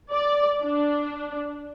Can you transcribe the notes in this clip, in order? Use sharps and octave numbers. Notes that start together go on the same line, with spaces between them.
D5
D4